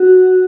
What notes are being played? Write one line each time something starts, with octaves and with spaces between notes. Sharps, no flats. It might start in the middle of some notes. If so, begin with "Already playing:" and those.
Already playing: F#4